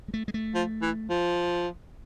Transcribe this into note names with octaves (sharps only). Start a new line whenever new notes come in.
G#3
A3
G#3
A3
F3
E3
F3